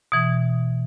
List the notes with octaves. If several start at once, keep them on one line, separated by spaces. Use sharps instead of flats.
B2 E3